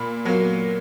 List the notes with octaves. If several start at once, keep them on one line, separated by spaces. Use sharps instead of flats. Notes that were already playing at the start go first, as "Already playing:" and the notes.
Already playing: A#2 B5
F#3 A#3